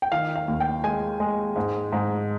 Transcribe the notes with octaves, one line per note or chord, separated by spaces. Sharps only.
G5
D#3 F5
F5
D#2
G5
G#3 G#5
G#3
G#2
G#2